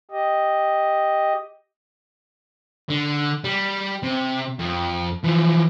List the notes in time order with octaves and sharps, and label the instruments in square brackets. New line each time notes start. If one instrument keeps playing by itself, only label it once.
[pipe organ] G4 D#5
[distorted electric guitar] D3
G3
C3
F2
E3 F3